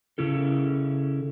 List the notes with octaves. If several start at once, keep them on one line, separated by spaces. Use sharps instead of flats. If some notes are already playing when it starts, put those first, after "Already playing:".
C#3 C#4 E4 A4